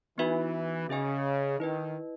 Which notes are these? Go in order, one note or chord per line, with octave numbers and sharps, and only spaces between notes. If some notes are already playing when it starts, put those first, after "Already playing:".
E3 B3 D#4 F#4 B4 E5
C#3 C#4 G#4 D#5 G#5
D#3 E4 B4 D#5